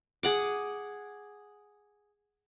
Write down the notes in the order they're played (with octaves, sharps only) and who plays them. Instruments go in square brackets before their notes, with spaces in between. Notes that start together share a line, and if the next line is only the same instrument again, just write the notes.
[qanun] G#4 F#5 D6